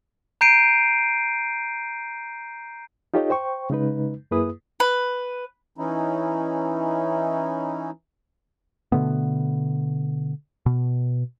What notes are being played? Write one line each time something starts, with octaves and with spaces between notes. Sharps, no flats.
A#5 G6 C7 D7 D#7
D#4 F4 G4 A4 C#5 D#5
C5 G5 C#6
C#3 G#3 D#4 B4
F#2 A#3 E4 G#4 B4 D#6
B4
E3 C#4 D#4 E4
B2 D3 A3 B3
B2